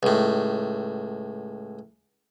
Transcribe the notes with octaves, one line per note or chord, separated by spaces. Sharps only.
C#2 A2